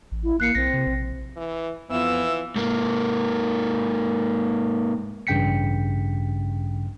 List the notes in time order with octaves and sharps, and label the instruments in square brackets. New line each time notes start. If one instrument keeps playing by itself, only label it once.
[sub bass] A1
[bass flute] E4
[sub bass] A1 [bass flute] A#3 [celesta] F#6 C7 C#7
[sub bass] B1 [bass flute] C4 [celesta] A#6
[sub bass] C3
A#1
[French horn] E3
[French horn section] F2 B3 [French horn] E3 [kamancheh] F4 E5 [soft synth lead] E6
[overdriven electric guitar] G#2 A#3
[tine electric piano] A1 G2 C#3 G5 B6 C#7